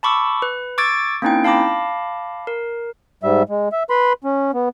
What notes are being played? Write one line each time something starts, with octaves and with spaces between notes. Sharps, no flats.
A5 B5 C#6 D6 E6
B4
C#6 D6 E6 G#6 A6 D7
A#3 C4 C#4 D#4 E4 G5
F5 A5 B5 D6 A#6
A#4
G#2 G3 E5
G#3
E5
B4 B5 C6
C#4
B3